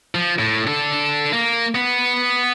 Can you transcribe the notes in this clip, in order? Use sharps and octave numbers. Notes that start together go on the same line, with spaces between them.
F3
A2
D4 A4
A#3
B3